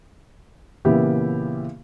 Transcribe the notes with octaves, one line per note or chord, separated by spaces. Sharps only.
A#2 C#3 E3 B3 E4 G4